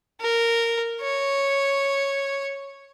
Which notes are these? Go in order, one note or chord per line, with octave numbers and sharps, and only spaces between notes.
A#4
C#5